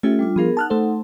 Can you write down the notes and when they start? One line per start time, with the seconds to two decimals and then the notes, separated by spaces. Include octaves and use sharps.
0.03 A3 C#4 F4 G4 A4 E5
0.19 G3 D4 F4
0.36 F3 B3 F4 G#4 A#4
0.57 D#4 F#5 A5 F6 F#6
0.70 A3 A4 C5